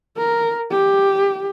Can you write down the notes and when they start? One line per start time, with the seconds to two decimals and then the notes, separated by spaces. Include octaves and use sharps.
0.17 A#4
0.71 G4